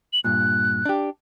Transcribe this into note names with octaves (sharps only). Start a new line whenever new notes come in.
F#7
G2 A#2 F#6
D4 G4